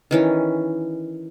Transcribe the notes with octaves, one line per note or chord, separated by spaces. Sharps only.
D#3 E3 C#4